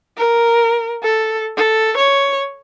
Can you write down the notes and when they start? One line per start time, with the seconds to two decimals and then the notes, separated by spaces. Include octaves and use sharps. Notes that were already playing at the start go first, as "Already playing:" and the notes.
0.17 A#4
1.03 A4
1.57 A4
1.97 C#5